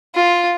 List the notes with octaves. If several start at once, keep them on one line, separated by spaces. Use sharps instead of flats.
F4